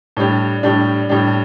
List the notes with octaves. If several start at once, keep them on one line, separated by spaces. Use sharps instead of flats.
A2 G3 D4 G4
A2 G3 D4 G4
A2 G3 D4 G4